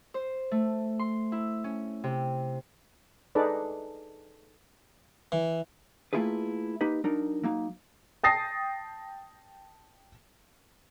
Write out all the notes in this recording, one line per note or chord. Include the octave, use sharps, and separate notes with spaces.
C5
A3
C6
E4
C#4
C3
D#4 G#4 A4 B4 D5
E3
A3 A#3 E4 F4 G#4 B4
A#3 D#4 G4 B4
F#3 D4 D#4 A#4
F#3 A#3 D#4
G5 A5 D#6 A6 A#6 C7